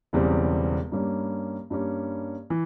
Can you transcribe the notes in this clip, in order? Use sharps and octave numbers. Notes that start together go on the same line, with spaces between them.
E1 E2 C#3 G3 C4
G2 G3 A#3 C#4
G2 G3 A#3 C#4
E3